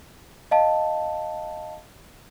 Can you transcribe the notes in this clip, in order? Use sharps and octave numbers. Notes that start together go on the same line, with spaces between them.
D#5 F5 A5